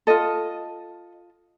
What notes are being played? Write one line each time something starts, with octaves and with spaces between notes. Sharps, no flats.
F4 A4 D#5